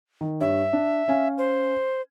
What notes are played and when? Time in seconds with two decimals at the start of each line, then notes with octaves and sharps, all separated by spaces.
0.21 D#3
0.41 G2 C#5 E5
0.73 D4
1.08 C#4 F5 G#5
1.38 C5